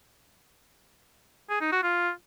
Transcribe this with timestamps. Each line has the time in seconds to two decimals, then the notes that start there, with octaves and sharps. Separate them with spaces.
1.50 G#4
1.61 D#4
1.72 F#4
1.83 F4